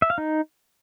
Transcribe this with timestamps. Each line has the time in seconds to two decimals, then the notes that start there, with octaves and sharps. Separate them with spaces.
0.02 E5
0.10 F5
0.18 D#4